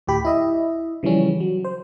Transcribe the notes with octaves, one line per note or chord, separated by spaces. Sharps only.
D2 A2 G4 B5
E4 D#5 E5
C#3 E3 F3 G3 C#4
F#3
C5